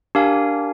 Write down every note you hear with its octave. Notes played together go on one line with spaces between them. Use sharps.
D4 G4 A#4 F5 G#5